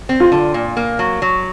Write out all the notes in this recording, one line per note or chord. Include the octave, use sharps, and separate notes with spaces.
C4
F4
D3
A#2
A#3
F#3
F#3